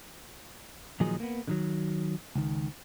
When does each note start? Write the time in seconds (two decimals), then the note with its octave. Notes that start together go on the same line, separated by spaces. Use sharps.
1.00 A#2 D#3 F3 F#3 D#4 G#4
1.20 A#3 B3
1.47 D3 D#3 F#3
2.35 C#2 D#3